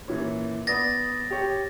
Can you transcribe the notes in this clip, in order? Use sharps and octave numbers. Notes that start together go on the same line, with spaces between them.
A#2 E3 C#4
B3 D5 D#6 A6 A#6
G4 C#5 G5